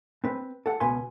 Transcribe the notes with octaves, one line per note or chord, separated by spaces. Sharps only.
C4 B4
A4 F#5
C#2 B2 B4 G#5 C6